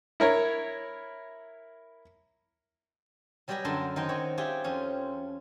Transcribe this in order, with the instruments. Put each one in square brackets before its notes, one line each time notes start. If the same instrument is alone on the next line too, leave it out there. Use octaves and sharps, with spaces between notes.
[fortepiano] E4 A#4 C#5
[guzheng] F#3 G3 G4 B4 D#5 G#5
F#2 D3 A#4 A5 B5 C6
D#3 D#4 C5 D#5 G5 G#5
C4 F#4 C#5
F4 G4 G#4 E5 G5 G#5
F2 C#4 C5